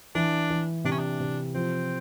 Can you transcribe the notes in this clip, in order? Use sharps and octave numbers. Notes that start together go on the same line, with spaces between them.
E3 D4
E3
C3 D4
C#4
D4
C3
F3 C4